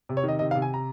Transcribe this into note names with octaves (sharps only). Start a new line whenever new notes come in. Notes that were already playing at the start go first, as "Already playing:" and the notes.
C3
C#5
D#3 D#5
C3 D#5
F5
C3
G#5
A#5